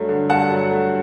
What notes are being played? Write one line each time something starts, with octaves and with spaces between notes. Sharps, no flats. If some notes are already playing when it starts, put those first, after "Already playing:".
Already playing: G2 F#3 A3
D3
G2 F#5 A5
F#3
A3